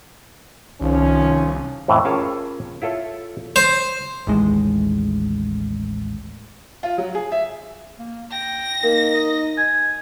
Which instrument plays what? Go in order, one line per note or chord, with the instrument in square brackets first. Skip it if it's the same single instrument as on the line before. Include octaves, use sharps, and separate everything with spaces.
[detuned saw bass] C2 [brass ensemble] D#3 F3 C#4
[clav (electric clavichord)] F2 A2 E3
C#4 F4 G#4 A#4 C#5 A5
E4 F4 A4 C#5
[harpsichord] C5
[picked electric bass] A1 D#2 A2 G#3
[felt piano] F4
F#3
G#4
E5
[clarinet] A#3
[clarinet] G5 [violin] A#6
[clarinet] A#3 [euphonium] D#4 [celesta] A#4
[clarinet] D#5
[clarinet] G#5 [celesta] G#6